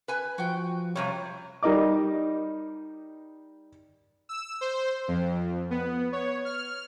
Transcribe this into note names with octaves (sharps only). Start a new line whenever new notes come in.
B4 G#5
F3 F#4 G5
F2 C3 G3 C#5
G3 D#4 A#4 D#5 D6
E6
C5
F2
B3
C#5
F6